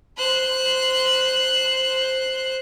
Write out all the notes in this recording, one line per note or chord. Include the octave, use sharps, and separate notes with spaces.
C5 F#6